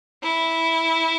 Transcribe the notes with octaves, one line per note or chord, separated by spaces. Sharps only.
E4